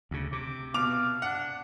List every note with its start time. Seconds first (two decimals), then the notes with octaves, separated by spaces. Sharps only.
0.11 D2 C#3
0.32 C3 D6
0.74 B2 F5 D6 F7
1.22 D4 F#5